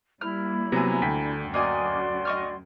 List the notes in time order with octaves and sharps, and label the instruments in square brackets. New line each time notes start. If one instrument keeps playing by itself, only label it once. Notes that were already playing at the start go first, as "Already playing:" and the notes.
[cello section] G3 A#3 [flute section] E4 B5 [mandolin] F6
[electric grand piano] C3 F#3 B3 [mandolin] G#5 A#5
[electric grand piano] D2 G5 B6 [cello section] D3
[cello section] F#2 [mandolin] A#3 D#5 G#5 [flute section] F#4 D5 C6
[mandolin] D#5 C#6 F6